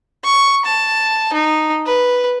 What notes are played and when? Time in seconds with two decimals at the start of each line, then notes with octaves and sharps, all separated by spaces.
0.24 C#6
0.65 A5
1.33 D#4
1.86 B4